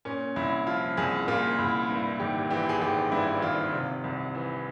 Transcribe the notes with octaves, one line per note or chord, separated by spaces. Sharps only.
A#2 C#4
C2 E4
F3 F4
C2 G#4
A#2 F4
C2 E4
G2 E4
G#1 G4
E3 G4
G#4
G#1 G4
G2 E4
G#1 F4
C3
C2
E3